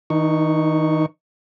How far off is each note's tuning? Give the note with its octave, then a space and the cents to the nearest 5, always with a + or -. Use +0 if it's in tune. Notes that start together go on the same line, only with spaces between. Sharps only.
D#3 +45 D#4 -20 C#6 +0